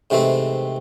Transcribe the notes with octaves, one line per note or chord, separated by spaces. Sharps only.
G#2 C3 E3 A3 C4